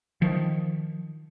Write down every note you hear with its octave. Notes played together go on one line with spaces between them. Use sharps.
D#3 F3